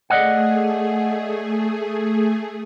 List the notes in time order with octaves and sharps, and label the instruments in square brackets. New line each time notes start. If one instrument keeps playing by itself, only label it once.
[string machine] A3 G#4 [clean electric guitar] D5 D#5 F#5